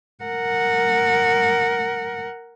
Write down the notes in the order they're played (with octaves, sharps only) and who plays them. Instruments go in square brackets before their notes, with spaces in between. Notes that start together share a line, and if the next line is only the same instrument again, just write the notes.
[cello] A#4 F#5